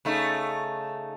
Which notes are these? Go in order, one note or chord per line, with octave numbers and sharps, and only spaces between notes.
C#3 A3 D#4